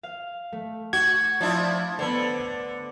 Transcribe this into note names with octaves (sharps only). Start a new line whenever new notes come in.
F5
A3
F#4 G#6
F3 D4 E4 A5
D3 B3 C5